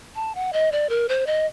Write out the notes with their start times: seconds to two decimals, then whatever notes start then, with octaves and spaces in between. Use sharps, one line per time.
0.15 A5
0.35 F#5
0.53 D#5
0.72 D5
0.89 A#4
1.09 C5
1.27 D#5